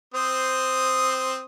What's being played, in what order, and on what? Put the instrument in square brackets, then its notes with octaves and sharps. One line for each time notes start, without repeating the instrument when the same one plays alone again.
[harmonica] C4 C5 D#6